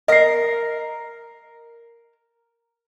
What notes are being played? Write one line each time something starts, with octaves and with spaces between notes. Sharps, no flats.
A#4 D#5 A#5 C7